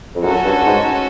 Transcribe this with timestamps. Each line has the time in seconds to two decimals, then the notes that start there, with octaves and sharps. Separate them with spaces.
0.15 F2
0.24 F#2 C#4 F#4 A4
0.45 G2
0.66 G#2